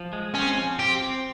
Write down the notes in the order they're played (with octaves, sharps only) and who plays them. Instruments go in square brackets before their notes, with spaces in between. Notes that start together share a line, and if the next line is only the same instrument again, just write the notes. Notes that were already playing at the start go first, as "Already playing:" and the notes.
Already playing: [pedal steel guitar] F3
G#3
[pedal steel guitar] C4 [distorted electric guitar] C#4
[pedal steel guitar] F3
[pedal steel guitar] C4 [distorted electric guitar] G4
[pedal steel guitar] C4